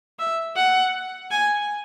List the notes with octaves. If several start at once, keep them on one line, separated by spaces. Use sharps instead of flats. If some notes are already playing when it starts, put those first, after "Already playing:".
E5
F#5
G#5